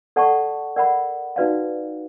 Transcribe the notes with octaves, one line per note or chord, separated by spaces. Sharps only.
A4 D5 F#5 A5 C#6
A#4 D5 F#5 B5
D#4 F#4 B4 D5 F5